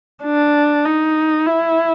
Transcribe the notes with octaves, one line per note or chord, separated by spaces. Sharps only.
D4
D#4
E4